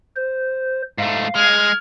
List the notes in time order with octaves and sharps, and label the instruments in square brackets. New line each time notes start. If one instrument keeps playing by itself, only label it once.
[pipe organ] C5
[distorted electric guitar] G#2 A3 [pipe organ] F5
[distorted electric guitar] G#3 [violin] F6 G#6